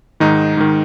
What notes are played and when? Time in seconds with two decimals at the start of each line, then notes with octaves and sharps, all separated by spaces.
0.20 G#2 D#3 D#4
0.57 G#2 D#3